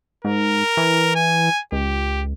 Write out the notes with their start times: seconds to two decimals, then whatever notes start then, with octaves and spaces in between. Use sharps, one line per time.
0.25 G#2 A#4
0.77 E3
1.15 G#5
1.72 C#2 G4